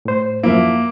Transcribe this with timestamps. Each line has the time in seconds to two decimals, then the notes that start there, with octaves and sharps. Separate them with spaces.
0.05 A2 C5
0.43 F#2 F3 A#3 E4 E5